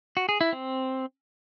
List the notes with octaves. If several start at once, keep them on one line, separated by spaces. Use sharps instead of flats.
F#4
G#4
E4
C4